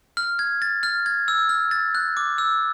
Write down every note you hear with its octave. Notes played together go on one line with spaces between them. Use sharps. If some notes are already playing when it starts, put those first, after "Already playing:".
F6
G#6
A6
F6
G#6
E6
F6
A6
F#6
D6
E6